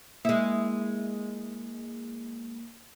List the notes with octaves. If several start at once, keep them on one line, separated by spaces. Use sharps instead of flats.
G#3 A#3 E4